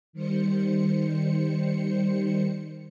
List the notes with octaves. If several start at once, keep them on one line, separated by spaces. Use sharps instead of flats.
D#3 G3 C5 C#7